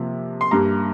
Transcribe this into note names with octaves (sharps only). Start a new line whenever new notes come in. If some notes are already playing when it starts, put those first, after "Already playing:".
Already playing: C3 F3 A#3
C6
G2 G3 A#3 A#5